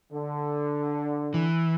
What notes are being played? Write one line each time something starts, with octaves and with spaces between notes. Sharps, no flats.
D3
E3